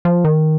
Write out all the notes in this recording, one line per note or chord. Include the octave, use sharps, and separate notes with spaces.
F3
D#3